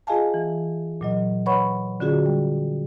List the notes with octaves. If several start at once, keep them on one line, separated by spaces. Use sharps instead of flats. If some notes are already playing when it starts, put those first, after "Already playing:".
F4 G#4 D#5 F5 G#5 A5
E3
A#2 F#3 D#5
B4 C#5 F#5 B5 C#6
D3 C#4 F4 F#4 G#4
G3